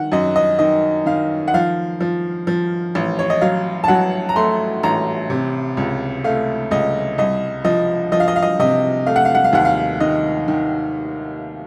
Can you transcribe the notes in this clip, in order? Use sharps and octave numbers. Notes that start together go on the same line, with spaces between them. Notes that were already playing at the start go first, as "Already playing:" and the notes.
Already playing: D#3 F#5
F#2 D#5
D#5
D#3 D#5
D#3 F5
F#5
F3 F5
F3
F3
A1
C#5
D#5
F#3 F5
A5
F#3 F#5
A#5
A3 C6
A1 A#5
C3
C#2
A3 F5
C#2 D#5
C2 D#5
F3 D#5
F3 D#5
F5
D#5
F5
D#5
C3 D#5
A3 F5
F#5
F5
F#5
F5
D#2 F#5
F5
D#3 D#5
D#3